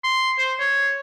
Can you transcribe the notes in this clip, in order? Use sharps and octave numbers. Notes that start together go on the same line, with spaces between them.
C6
C5
C#5